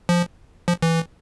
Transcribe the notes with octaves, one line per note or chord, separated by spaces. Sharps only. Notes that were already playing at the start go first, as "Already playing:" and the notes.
F3
F3
E3